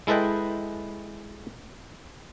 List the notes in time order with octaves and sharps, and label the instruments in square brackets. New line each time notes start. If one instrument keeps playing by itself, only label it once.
[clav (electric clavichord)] G#3 E4 A4 B4 D#5 G5